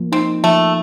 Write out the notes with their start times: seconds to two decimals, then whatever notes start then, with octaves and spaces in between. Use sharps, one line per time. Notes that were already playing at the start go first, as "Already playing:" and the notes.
Already playing: F3 A#3
0.12 C4 D#4
0.44 F3 A3